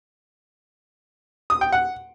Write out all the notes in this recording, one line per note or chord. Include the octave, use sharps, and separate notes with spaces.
D#6
G5
F#5